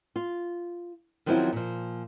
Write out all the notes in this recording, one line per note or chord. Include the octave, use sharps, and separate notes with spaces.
F4
D#3 F3 F#3 C4 C#4 E4
A#2 F3